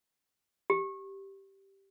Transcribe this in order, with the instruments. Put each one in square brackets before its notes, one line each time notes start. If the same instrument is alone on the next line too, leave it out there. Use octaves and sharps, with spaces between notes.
[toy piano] G4